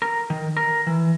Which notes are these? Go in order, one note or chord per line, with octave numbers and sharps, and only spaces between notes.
A#4
D#3
A#4
E3